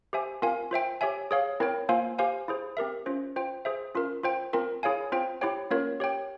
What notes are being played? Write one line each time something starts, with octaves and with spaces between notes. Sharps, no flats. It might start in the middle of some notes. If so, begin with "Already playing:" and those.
G4 C5 E5 G#5
C4 F4 A#4 F5 G#5
F4 C5 E5 G5
G4 C#5 E5 G#5
G#4 C#5 F5
C4 E4 A#4 C#5 G5
A#3 F4 C5 F5 G#5
G4 C5 F5 G#5
E4 G#4 C5
C4 G4 A#4 E5
C#4 F4 C5
F4 C5 G5
G#4 C5 E5
C#4 F4 A#4
F4 C5 G5
C4 F4 A#4
E4 G#4 C#5 F5 G#5
C4 F4 C5 G5
E4 G4 C#5 G5
A#3 C#4 F4 A#4 C#5
G4 C#5 G5